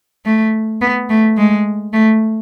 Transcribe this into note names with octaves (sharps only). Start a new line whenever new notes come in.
A3
B3
A3
G#3
A3